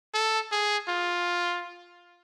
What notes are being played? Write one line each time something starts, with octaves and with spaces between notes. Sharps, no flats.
A4
G#4
F4